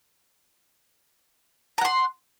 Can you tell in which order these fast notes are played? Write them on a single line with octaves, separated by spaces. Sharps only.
A#5 F#5 C6